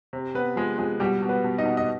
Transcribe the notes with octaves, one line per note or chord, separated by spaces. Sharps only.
C3
C3 B3 B4
F3 G#3 G#4
F3 G#3 G#4
B2 G3 G4
B2
B3 B4
B2
D#4 D#5
B2
D#5